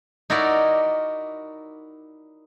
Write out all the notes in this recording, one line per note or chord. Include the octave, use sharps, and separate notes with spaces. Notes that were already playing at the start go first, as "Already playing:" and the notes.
D#4 E4 F#4 A#4 D5